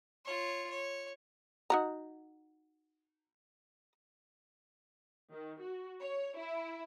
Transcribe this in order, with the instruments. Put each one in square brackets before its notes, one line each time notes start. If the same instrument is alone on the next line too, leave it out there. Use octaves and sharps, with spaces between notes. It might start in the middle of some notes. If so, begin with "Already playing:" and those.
[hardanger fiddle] F4 C#5
C#5
[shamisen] D#4 F#4 A#5
[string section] D#3
F#4
C#5
E4